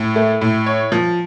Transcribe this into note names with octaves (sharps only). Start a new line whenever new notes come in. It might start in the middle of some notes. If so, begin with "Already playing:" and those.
Already playing: A2
A3
A2
C#5
F3